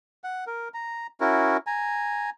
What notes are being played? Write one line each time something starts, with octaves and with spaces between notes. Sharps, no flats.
F#5
A#4
A#5
C#4 E4 F#4 A#4
G#5 A#5